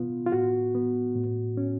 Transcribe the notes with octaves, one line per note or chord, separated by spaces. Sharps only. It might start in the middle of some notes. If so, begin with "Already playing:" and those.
Already playing: B2 B3 F4
F4
A2 F#4
B3
A2
C#4